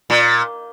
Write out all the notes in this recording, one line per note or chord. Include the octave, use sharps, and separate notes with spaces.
A#2